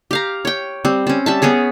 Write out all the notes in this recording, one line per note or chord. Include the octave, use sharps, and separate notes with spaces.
G4 F5 A#5
C#5 G5
G3 C4
C4 C#4
G3 E5 A5
B3 C#4 G#4 C#5